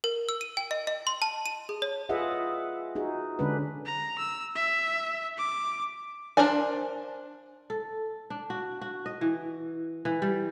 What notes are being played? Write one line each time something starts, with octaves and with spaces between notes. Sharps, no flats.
A#4
E6
D#7
G5
D#5
D#5
C6
A5
D#7
G#4
C#5
F4 G#4 B4 D#5 E5 F#5
D#4 F#4 G#4
D3 G#3 C#4 D4 B4
A#5
E6
E5
D6
D4 A#4 C5 D5 G#5
A4
D4
F#4
F#4
D#5
E3
E3
G3